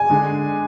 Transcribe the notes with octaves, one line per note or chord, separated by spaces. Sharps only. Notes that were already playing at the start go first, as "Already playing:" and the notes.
Already playing: G#5
D3 G#3